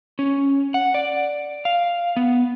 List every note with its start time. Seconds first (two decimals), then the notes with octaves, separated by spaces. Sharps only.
0.19 C#4
0.74 F#5
0.94 D5
1.65 F5
2.17 B3